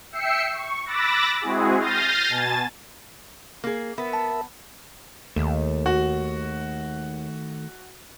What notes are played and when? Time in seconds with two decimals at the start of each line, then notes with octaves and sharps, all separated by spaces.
0.12 E5 G5 E6 C7 C#7
0.51 C#6
0.86 B5 D6 E6 F#6 A6 A#6
1.41 G#3 C4 E4 F#4 G#4
1.79 F6 G6 A6 A#6 C7 D#7
2.29 B2 G#5 A5 A6
3.64 A#3 G#4
3.98 B3 A#4 E5 B5
4.13 A5
5.36 D#2 D#3 A3
5.86 F#4